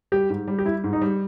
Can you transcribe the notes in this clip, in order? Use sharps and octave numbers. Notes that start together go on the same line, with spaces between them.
G3 G4
G#2
G3
G4
G3 E4
G#2
D#4
G3